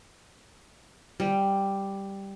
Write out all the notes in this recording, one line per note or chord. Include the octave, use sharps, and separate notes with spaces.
G3